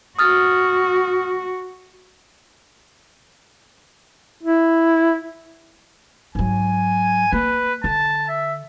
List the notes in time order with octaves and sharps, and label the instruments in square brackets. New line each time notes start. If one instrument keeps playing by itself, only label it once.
[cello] F#4 [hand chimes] D#6 F6 A6
[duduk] E4
[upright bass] G#2 F#3 [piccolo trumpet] G#5
[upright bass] A#3 [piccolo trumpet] B4
[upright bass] D3 [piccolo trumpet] A5
[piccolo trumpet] E5